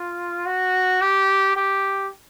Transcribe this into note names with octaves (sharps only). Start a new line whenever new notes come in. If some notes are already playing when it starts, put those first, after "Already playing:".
Already playing: F4
F#4
G4
G4